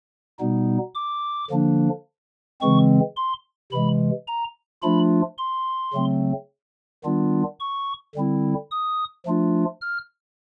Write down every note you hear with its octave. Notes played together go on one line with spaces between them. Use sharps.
B2 G3 B3 D#4
D6
D3 F3 A#3 D4
C#3 E3 G#3 C4 C#6
C6
C3 E3 G#3 B5
A#5
F3 A3 D4 F4 B5
C6
C#3 F#3 A3 C4
D#3 G3 B3 D4 F4
C#6
D3 G3 C4 E4
D#6
F3 A3 D4 F4
F6